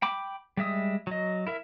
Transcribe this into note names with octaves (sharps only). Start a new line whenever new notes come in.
G5 B5 D6
G3 G#3 E5 D#6
F#3 D#5
E4 A#4 E5